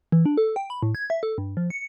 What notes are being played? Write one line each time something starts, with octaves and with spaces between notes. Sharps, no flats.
E3
D4
A4
G5
B5
A2
G#6
E5
A4
G2
F3
C#7